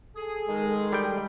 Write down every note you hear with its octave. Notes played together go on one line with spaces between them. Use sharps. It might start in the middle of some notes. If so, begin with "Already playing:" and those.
G#4 A4
D#3 G#3
G3 G5